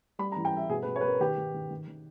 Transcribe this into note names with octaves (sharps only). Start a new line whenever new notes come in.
G3 B5
A#5
E3
G5
G3 E5
B2 G#4
B4
B2
C#5
B4
B2 A#4
D#3 G4
D#3
D#3
D#3
D#3